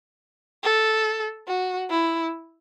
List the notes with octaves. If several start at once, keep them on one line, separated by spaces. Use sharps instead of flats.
A4
F#4
E4